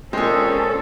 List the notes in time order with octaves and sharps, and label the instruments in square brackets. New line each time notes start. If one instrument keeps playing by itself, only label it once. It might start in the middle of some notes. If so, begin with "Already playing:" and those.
[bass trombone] A#2 [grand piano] G#3 [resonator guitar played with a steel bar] C4 G#4 [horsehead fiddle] C#4 A4